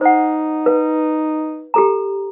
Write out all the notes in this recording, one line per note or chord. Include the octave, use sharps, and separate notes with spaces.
D#4 C5 F#5
B4
G4 A4 A#5